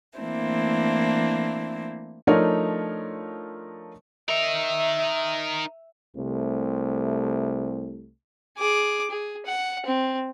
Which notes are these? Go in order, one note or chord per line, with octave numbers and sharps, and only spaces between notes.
E3 A3 A#3 C4 D4 E4
F3 A3 D4 D#4 A#4 C#5
D#4 A#4 E5
C2 C3 A3
G#4 D6
G#4
F#5
C4